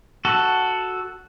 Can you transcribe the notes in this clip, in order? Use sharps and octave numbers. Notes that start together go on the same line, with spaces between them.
F#4 A4